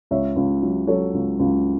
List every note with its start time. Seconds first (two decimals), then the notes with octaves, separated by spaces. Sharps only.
0.11 C#2 C#5 E5
0.36 C#2
0.63 F#3
0.87 F#3 A4 C#5
1.14 C#2
1.40 C#2